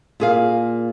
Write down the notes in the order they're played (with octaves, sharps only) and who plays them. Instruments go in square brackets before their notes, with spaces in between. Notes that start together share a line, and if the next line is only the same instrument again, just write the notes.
[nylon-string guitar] A#2 G#4 F5